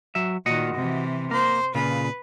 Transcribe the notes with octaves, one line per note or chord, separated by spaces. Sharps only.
F#3 E5
A#2 D#3 F#4 D#5 F#5
C3 E3
A#3 A#4 C5
A#2 C#3 F4 B4